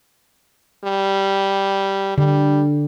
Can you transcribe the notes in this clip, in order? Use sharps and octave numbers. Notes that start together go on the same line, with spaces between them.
G3
D3 G3